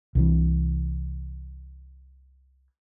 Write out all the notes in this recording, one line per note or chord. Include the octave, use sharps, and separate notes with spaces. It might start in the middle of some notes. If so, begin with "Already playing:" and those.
C2 C3 E3